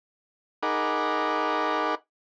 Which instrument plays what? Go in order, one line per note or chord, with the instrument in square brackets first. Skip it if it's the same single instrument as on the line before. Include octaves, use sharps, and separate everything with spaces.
[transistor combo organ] D#4 G#4 A#4 F#5 B5 D6